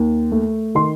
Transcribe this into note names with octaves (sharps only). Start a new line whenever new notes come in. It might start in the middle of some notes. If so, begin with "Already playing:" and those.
Already playing: D#2
A3
D#3 C6